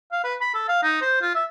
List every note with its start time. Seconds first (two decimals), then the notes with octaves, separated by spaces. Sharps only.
0.12 F5
0.24 B4
0.41 B5
0.54 A4
0.68 F5
0.83 D#4
1.01 C5
1.21 F4
1.34 E5